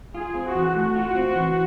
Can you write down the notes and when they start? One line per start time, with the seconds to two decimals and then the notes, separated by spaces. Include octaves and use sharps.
0.15 F4 G#4
0.35 C4
0.45 F#4
0.55 E3
0.75 A3 F#4
0.95 F4
1.15 C4
1.35 E3